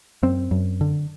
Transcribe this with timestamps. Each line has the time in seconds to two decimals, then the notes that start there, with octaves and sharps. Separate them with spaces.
0.23 F#2 C4
0.51 F#2
0.81 D3